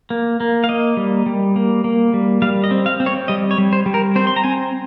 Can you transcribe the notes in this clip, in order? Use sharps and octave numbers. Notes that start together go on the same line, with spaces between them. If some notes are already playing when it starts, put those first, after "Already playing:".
A#3
A#3
F5
A#3 D#5
G3
G3
A#3
A#3
G3
G3 F5
D#5
C4
F5
C4
C#5
G3 D#5
C#5
G3
C5
G3
A#4
C4 C5
C6
A#5
C4 G#5